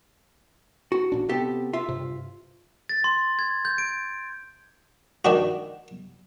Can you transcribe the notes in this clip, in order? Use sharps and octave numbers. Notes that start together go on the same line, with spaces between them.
F#4
A1 A#2 D4
C3 B3 C4 G4 A4
F4 E5
G2 C3
A6
C6
G#6
G6
D7
D#3 D4 F#4